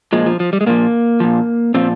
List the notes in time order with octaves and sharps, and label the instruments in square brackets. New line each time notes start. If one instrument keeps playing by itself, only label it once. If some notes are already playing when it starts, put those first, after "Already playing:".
[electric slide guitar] A#2 F3 G#3
F3
F3
G3
G#3
A#2 F3 A#3
A#2 F3
A#2 F3 C4